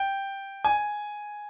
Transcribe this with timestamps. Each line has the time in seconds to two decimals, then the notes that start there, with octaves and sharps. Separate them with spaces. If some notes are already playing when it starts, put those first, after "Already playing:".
Already playing: G5
0.65 G#5